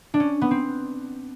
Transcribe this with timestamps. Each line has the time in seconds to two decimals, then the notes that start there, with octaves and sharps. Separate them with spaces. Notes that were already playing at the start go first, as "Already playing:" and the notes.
0.14 D4
0.20 C#4
0.41 B3
0.51 C4